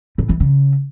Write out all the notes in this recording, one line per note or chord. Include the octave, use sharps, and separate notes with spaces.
A2
E3
C#3